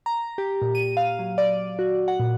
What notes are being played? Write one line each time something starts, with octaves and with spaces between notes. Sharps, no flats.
A#5
G4
A#2
D#7
F5
F#3
D5
F#4
F#5
A#2